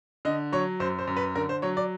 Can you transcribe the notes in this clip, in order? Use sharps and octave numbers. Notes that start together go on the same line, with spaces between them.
D3 D#5
F#3 C#5
F#2 C5
C5
F#2
B4
D3 A#4
C5
F#3 C#5
D5